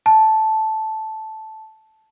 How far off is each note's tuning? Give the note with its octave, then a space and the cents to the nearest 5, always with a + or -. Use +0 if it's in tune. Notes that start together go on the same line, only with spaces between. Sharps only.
A5 -5